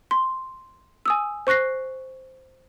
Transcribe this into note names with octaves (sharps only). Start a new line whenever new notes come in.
C6
G#5 D#6 E6
C5 C#6 F#6 A#6 C7